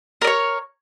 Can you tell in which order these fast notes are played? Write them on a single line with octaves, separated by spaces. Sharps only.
A#4 D5 C#5